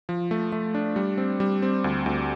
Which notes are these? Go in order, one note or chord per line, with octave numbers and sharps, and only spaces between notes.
F3
A3
A3
D4
G3
C4
G3
C4
D2
D2